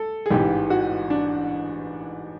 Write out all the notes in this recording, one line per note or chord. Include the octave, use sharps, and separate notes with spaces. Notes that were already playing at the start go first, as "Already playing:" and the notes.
Already playing: A4
G#4
A1 G#2 E3 G4
F#4
D4